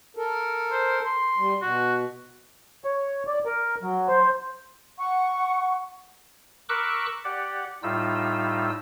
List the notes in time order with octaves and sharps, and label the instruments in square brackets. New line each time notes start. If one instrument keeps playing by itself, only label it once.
[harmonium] A4 A#4
[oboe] C5
C6
[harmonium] G3
[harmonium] B2 [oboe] F#4
[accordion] C#5
D5
A#4
F#3
C5
[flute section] F#5 C#6
[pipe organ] A#4 B5 C#6 D6 E6 F#6
G4 D5 F#5
A2 G3 D#4 F4 E6